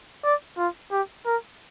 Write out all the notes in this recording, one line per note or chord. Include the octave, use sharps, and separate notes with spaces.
D5
F4
G4
A#4